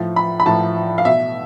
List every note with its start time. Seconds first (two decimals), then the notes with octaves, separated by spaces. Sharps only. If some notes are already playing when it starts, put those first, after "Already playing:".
Already playing: A2 F3
0.16 B5
0.40 B5
0.46 A2 F3 A5
0.98 F5
1.05 B2 E5